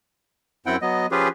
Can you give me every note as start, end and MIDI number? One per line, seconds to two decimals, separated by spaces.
0.66 0.76 42
0.66 0.76 60
0.66 0.76 64
0.66 0.76 78
0.66 0.76 79
0.82 1.06 54
0.82 1.06 59
0.82 1.06 75
1.11 1.29 53
1.11 1.29 61
1.11 1.29 65
1.11 1.29 67
1.11 1.29 68
1.11 1.29 71